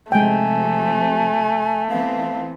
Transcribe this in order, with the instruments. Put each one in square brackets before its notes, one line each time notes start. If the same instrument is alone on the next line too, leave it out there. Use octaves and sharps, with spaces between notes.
[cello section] C3 F3 [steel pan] G#3 G5 [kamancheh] A3 [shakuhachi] G#5
[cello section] E3 B3 C4 [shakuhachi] F5